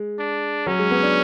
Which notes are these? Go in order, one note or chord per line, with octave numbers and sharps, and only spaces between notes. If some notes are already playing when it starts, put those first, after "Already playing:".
Already playing: G#3
D4
F#3 C#4
G#3
B3
D4